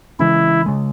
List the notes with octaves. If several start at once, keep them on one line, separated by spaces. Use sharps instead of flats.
C#3 E3 G#3 C#4 E4
C#3 G#3